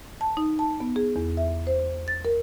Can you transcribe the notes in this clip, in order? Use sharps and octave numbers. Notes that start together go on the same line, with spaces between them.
A5
D#4
A5
B3
G#4
E2
E5
C5
A6
A#4